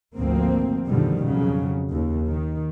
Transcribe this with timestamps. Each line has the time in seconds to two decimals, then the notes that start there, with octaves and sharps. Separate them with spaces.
0.17 G#1 D2 F3 A#3 C4
0.88 F#2 B2 D3 D#3 F3 G3
1.24 F2 C#3 F#3
1.89 D#2
2.29 D#3